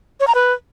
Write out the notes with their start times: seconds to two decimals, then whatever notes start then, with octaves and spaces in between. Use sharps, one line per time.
0.20 C#5
0.27 A#5
0.35 B4